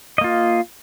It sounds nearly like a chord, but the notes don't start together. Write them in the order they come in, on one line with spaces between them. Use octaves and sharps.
D#5 A#3 F4